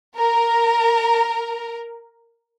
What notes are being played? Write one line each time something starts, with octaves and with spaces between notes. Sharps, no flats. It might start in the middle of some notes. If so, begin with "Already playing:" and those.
A#4 A#5